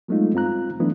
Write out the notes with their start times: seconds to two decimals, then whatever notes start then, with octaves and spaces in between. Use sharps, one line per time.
0.08 F#3 G#3 A3 B3 D#4 F4
0.34 G2 C4 F4 A#5 F#6
0.79 E3 F#3 A3 B3 D4 E4